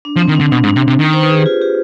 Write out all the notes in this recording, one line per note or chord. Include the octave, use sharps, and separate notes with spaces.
D4
F3
C4
D#3
D3 D4
B2 D4
G#2
D4
C3
C3
D#3
C5
B4
G#4
G4
F4
G4